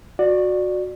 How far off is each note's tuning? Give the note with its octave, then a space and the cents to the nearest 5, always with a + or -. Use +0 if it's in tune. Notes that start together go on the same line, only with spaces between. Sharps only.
F#4 -15 D5 +15